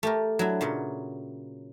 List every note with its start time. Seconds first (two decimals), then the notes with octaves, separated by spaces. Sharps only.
0.03 A3 G4 A#4
0.39 F#3 D4 E4
0.61 A#2 C#3 F#3